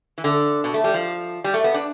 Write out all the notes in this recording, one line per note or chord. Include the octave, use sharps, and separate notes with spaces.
E3
D3
B2
A3
G3
F3
G3
A3
B3
D4